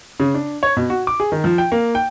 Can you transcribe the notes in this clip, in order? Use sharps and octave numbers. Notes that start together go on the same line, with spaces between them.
C#3
D4
C#5
B2
F#4
D6
G#4
D#3
F3
G5
A#3
G5